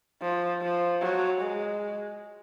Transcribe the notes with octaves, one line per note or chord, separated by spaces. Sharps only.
F3
F3
F#3
G#3